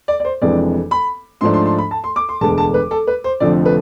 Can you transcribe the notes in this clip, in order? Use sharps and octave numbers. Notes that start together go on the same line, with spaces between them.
D5
D5
C5
F1 F2 E3 G#3 D4 D5
B5
G#2 F3 A3 D4 C6
C6
C6
B5
A5
C6
D6
C6
E1 D2 D3 G#3 B3 A5
A5
B4
A4
B4
C5
F1 F2 D3 F3 A3 D5
B4